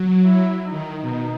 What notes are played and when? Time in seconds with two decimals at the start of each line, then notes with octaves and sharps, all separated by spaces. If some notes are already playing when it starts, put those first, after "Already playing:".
Already playing: F#3
0.25 E4
0.71 D#3 D#4
1.02 B2